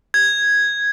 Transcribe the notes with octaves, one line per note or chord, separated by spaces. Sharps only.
G#6